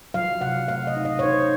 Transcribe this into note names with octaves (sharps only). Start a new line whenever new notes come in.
F#3 F5
C3 F#5
A3 F5
D#5
D#4
D#5
C#5
D#4 C5